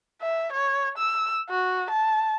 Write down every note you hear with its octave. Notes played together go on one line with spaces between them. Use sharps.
E5
C#5
E6
F#4
A5